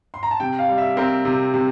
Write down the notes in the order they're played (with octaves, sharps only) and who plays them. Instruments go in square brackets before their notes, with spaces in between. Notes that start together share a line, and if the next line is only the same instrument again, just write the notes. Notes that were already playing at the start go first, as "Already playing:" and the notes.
[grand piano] C6
A#5
A5
C3 G5
F5
G3
E5
C4 A#4
C3
C3